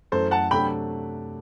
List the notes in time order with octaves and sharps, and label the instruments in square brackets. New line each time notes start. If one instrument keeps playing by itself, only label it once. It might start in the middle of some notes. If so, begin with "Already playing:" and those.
[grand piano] F#2 E3 A3 [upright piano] A4 C5
[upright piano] F#5 A5
[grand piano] C3 F#3 A3 D4 A4 [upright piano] G5 B5